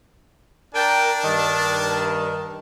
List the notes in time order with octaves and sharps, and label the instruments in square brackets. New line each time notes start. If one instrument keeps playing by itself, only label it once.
[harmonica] D4 A5 [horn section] A#4 G5
[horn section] G2 D#3